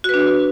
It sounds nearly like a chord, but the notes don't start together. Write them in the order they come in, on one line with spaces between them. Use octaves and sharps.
F#4 B4 D4